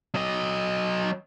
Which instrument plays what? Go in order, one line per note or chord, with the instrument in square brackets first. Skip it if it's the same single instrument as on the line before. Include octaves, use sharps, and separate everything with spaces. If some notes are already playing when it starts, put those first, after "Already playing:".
[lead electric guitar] F#3 D#5